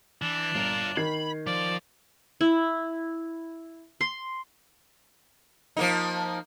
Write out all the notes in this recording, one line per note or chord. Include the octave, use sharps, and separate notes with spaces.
E3 D4
G1 F4 A#4
D#3 B5 G#6 C7
F3 D5
E4
C6
F3 A#3 D#4